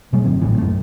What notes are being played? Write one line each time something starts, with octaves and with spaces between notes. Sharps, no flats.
B2 F#3 G#3 A3
G1 D3 C4
D1 A1 A2 E3
F#2 A3